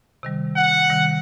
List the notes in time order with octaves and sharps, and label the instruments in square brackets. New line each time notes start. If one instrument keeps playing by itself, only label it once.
[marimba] C3 D#3 G3
[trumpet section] F#5
[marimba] C3 D#3 G3